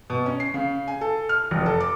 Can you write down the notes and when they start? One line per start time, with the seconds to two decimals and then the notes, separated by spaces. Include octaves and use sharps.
0.10 B2
0.26 C#4
0.40 C7
0.54 C#3
0.88 G#5
1.01 A4
1.29 F6
1.51 F1
1.66 A4
1.80 D6